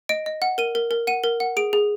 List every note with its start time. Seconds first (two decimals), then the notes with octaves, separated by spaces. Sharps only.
0.09 D#5 D7
0.26 D#5
0.42 F#5
0.58 A#4 D#7
0.75 A#4
0.91 A#4
1.07 F#5 D#7
1.24 A#4
1.40 F#5
1.57 G#4 D7
1.73 G#4